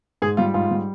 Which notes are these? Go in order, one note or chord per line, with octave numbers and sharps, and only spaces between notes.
G#2 G#4
G3 F4
G#2 F4
G3